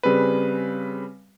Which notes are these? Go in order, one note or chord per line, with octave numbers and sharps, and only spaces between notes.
C#3 G3 C4 G#4 B4